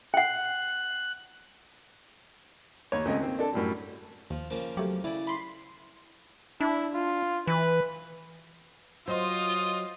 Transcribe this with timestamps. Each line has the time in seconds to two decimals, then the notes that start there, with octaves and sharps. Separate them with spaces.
0.14 F#5 G5 F#6
2.92 D#2 C#5
3.05 C#2 A3 C4 C#4 D#5
3.20 D#3 A#3 C4
3.39 D4 A4
3.53 F#2 A2 G3
4.30 D#2 F3
4.50 C#3 F3 A#3
4.77 F#3 A3 G4
5.04 C#3 E4 D5
5.27 B5 C6
6.61 D4 E4
6.94 F4
7.47 E3 B4
9.08 F#3 F4 C5 D#5 C6 D#6